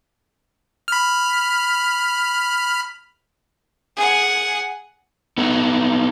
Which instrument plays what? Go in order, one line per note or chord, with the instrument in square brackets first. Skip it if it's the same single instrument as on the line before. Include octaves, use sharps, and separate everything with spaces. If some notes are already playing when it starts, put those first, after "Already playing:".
[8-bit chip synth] B5 F6
[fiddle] G#4 F#5
[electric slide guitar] B3 D#4 A4